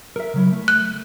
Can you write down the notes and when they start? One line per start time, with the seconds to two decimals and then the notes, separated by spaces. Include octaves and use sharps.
0.16 A#4 E5
0.34 C#3 F#3 E4
0.52 A3
0.68 F#6